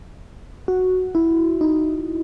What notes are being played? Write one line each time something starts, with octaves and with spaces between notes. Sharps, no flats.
F#4
E4
D#4